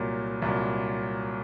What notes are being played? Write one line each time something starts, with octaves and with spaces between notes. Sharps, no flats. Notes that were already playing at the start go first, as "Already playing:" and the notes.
Already playing: C2 A#2 F#3
C2 A#2 F#3